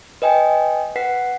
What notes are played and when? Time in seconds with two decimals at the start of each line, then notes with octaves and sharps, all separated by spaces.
0.22 B4 D#5 G5 G#5
0.96 B4 F#5 B6 C7